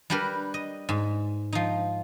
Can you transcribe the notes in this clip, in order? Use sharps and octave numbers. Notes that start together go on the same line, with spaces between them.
G3 D4 G4 A#4 B4
D#5
G#2
F3 D#4